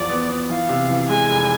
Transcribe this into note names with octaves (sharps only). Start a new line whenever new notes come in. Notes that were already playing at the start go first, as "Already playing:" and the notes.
Already playing: E2 F3 D5
B3
B3
E3 F5
C3
E3
G#3 G#5
F1